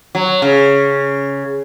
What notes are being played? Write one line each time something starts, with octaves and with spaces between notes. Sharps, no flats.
F#3
C#3